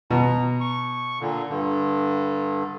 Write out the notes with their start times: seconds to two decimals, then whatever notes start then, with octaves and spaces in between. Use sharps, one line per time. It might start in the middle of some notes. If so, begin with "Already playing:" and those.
0.11 B2 A#5
0.60 C#6
1.20 A#2 D3
1.50 G2 D3